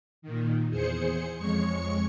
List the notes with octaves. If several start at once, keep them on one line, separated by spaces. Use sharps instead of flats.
A#2 D#3
E2 G#4 C5 C#7
F2 G#3 C#5 C#6 C#7